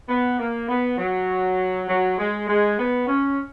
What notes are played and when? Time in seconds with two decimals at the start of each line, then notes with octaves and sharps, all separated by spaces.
0.09 B3
0.39 A#3
0.68 B3
0.98 F#3
1.88 F#3
2.18 G#3
2.48 G#3
2.78 B3
3.07 C#4